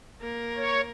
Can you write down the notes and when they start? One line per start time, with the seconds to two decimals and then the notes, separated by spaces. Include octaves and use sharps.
0.21 A#3 A#4
0.56 C#5